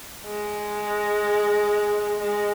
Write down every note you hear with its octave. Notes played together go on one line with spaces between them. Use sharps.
G#3
G#3